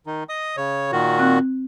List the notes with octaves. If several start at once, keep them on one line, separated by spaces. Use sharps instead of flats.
D#3 D#4
D#5 D#6
C#3 C#5
A#2 D#3 F#4
C4 F#6